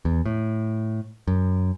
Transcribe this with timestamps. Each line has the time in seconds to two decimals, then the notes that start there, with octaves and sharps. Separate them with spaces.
0.05 E2
0.26 A2
1.28 F#2